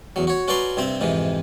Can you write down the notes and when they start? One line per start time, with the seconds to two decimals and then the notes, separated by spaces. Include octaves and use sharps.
0.16 E2 F#3
0.27 F#4 C#5
0.48 C#4 F#4 B4 D5 A#5 C6
0.77 G2 C3 C4 E5
1.01 F2 G#2 C3 E3